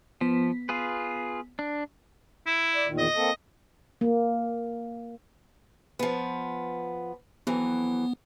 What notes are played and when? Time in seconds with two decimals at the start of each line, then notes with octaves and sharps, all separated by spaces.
0.21 F3 B3 B6
0.69 F4 G#4 B4
1.59 D4
2.46 E4
2.75 D5
2.87 E2 A#2 D#3
2.98 D#5
3.16 A#3 C4 A4
4.01 A#3
5.99 F3 B3
7.47 F2 E3 F#3 B3